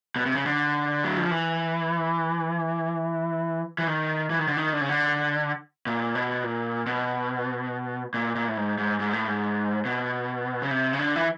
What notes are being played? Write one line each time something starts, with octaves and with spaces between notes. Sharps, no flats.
B2
C3
C#3
D3
F#3
F3
E3
E3
D#3
E3
D#3
D3
D#3
D3
C#3
D3
A#2
B2
A#2
B2
A#2
A#2
A2
G#2
G#2
G#2
A2
G#2
B2
C#3
C3
C#3
D3
E3